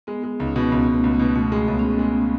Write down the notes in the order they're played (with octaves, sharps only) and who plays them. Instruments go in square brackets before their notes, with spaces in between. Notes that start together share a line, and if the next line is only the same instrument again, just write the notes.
[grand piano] G#3 [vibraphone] B3
[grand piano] G#3
[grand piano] C#2 [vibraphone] D#4
[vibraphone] C#4
[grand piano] B2 [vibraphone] B3
[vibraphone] C#4
[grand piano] C#2 [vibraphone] B3
[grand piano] C#2
[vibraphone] A3
[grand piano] C#2
[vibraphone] B3
[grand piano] B2
[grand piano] B2 [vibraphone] A3
[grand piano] G#3
[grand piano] C#2 [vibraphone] B3
[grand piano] G#3 [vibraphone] C#4
[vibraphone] B3
[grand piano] G#3